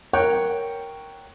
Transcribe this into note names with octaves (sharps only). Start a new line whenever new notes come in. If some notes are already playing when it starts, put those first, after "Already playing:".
A#4 C#5 F#5 G5